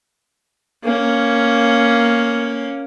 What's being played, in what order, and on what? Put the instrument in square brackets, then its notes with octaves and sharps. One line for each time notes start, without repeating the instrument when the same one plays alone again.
[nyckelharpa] A#3 C#4